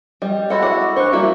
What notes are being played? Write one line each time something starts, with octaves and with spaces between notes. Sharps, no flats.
G3 D#5 G5
G#3 E4 F#4 A4 C#5 F#5
F#5 D6 E6
D4 C5 C#6 F#6
G3 A#3 E4 F#4 D5